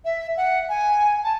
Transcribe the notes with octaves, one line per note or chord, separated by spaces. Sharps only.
E5
F#5
G#5
A5